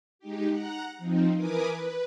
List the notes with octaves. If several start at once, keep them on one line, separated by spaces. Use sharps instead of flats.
G#3 D#4 G4
F#5 A#5 F#6
F3 C4 D#4
E3 A#4 B4 G#5 D6 D#6
B4